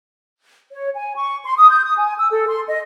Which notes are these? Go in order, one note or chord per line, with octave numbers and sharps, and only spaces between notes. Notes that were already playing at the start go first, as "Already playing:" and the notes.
C#5
G#5
C#6
C6
D#6
G6
D#6
G#5
E6
A4
C6
D#5